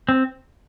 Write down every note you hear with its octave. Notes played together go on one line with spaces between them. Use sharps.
C4